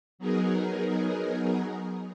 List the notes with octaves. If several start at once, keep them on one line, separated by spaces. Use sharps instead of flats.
F#3 B3 D#4 G#4 A#4